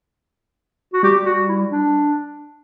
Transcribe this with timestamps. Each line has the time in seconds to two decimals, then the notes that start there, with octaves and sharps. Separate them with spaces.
0.93 F#4
1.03 G3 G4
1.26 F#4
1.49 E4
1.71 D4